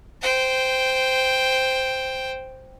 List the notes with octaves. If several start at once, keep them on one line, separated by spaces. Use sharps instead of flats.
C5 G5